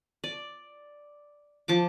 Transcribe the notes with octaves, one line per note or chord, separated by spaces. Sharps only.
D5
F3 A5 D6